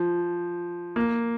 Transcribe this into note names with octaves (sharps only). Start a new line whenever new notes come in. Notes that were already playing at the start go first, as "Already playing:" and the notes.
Already playing: F3
A#3